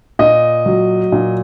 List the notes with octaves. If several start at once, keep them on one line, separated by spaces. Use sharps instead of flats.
A#2 D#5
F#3
A#2